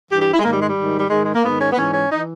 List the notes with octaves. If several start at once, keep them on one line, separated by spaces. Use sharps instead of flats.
G2 E3 G4
G4
E4
G#3
G#2 D#3 A#3
G3
G#3
G3
G#2 D#3
G3
G#2 D#3 G#3
G#3
A#3
G#2 D#3 B3
C#4
B3
G#2 E3 C#4
C#4
E3 D#4